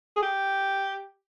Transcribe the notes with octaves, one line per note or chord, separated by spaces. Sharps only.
G#4
G4